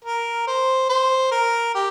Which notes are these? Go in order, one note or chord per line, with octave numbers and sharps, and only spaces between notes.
A#4
C5
C5
A#4
G4